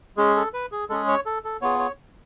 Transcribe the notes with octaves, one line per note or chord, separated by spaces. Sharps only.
G#3 C#4 G#4
A4
B4
G#4
G#3 C#4 G#4 A4
C#5
A4
A4
B3 F4 G#4 C#5
C#5